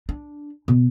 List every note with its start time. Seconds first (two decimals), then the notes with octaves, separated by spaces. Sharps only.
0.09 D4
0.68 B2